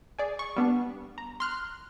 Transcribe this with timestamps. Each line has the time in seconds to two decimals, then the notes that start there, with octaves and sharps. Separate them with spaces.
0.19 G#4 D5
0.39 C#6
0.56 G3 B3 D4
1.18 A#5
1.40 C6 F6 F#6